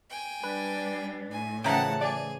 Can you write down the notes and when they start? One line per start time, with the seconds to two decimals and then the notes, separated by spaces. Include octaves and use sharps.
0.10 G5 G#5
0.43 G3 D4 B4
1.31 A2 G#5
1.64 C#3 E3 F3 F#5 G5 A5 A#5
2.01 G#4 D5